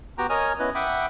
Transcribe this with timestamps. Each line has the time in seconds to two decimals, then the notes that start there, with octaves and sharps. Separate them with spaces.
0.18 B3 F#4 G4 G5 A#5
0.30 A#4 C#5 D#5 G#5 D#6 F6
0.59 B3 C#4 E4 B4 D#5
0.75 E5 F#5 G5 B5 D6 D#6